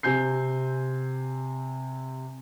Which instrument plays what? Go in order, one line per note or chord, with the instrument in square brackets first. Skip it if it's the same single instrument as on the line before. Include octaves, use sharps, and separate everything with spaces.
[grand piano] C3 C4 G#5 G6 C7